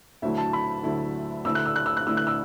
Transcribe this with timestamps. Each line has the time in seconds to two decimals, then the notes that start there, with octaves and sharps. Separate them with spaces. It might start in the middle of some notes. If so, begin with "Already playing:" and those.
0.22 D2 D3 F#3 A3 E4 E5
0.38 A5
0.53 B5
0.83 D2 D3 F#3 A3 E4
1.45 D2 D3 A3 E4 E6
1.55 F#6
1.66 E6
1.76 F#6
1.86 E6
1.97 F#6
2.06 D2 D3 A3 E4 E6
2.17 F#6
2.27 E6